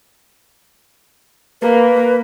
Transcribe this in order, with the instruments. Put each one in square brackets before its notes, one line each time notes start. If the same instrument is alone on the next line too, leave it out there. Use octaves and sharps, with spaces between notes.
[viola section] A#3 [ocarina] B4